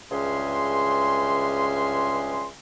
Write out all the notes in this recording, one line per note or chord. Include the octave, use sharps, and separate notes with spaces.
C#2 G2 C#4 G#4 E5 C6